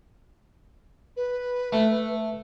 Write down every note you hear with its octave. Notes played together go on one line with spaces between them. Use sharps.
B4
A3